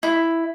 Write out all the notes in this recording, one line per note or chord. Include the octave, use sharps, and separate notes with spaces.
E4